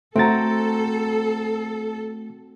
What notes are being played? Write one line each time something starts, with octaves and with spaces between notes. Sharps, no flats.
A3 C4 F#4 A4 A#5 A6